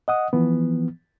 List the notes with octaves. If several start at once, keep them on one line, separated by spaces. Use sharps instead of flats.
D#5 F#5 D#6
E3 F3 B3